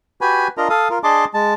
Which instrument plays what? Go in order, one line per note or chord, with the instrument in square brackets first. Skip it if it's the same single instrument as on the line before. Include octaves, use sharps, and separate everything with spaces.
[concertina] F#4 G4 B4 G#5 B5
D4 F4 A#4 D#5 A#5
A4 F5 D#6
F4 A#4
D4 G#4 D#5 A5 C6 D6
G#3 A5